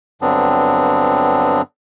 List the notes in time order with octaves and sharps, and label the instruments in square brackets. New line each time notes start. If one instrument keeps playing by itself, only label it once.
[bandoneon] G2 D3 F#3 B3 C4 D4